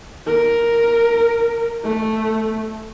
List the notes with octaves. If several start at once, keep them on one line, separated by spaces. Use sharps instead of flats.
A#4
A3